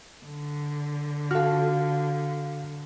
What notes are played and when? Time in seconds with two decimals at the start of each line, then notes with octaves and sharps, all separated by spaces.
0.25 D3
1.31 F#4 A4 F5 F6